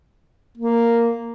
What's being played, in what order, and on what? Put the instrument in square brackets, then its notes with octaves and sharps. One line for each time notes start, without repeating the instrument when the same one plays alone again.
[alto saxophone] A#3